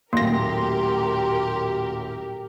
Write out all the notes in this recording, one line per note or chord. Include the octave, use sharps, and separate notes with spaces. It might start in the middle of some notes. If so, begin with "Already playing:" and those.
D#1 A2 F#3 A#3 G4 A#4 C6 A#6